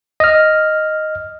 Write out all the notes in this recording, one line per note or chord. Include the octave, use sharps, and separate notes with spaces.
D#5 F6